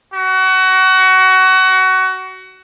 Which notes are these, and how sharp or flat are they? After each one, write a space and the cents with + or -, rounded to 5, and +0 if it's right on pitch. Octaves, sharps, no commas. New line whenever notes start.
F#4 +25